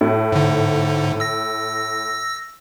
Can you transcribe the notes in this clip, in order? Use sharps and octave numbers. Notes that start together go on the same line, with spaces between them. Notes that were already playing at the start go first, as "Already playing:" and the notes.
A2
G#2 D3
E6 A#6